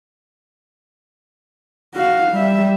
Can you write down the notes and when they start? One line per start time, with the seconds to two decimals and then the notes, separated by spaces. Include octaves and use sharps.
1.95 F#4 F5
2.32 G3 E5